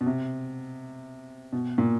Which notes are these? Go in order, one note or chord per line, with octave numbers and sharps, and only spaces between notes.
B2
C3
B2
A#2